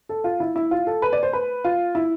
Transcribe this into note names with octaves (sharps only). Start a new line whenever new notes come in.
A4
F4
E4
E4
F4
A4
B4
D5
C5
B4
F4
E4